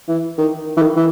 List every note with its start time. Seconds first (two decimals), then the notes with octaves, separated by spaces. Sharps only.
0.08 E3
0.38 D#3
0.77 E3
0.82 D#3
0.96 E3